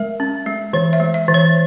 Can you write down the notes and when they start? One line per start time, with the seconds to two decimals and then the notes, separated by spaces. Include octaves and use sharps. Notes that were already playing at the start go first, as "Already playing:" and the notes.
Already playing: G#3 A#4
0.20 C#4
0.46 G#3
0.73 E3 C#5
0.93 E5
1.00 G#3
1.14 E5
1.28 E3
1.34 C#5